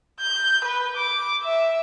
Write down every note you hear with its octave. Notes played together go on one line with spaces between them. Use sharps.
G6
B4
D6
E5